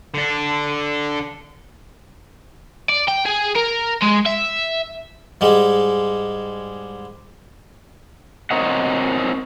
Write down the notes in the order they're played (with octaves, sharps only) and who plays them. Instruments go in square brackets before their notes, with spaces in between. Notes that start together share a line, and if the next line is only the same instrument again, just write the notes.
[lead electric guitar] D3 D4
[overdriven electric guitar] D5
G5
G#4
A#4
G#3
E5
[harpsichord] G#2 G3 G#3
[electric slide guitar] C4 A#4 C#5 D#5 F#5